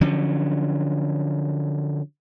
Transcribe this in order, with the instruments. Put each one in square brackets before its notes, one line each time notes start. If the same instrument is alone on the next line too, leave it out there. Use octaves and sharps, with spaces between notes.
[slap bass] D3 F3 F#3 C#4